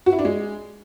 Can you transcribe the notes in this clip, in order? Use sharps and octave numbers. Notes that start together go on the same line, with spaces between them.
F#4
E4
D4
G#3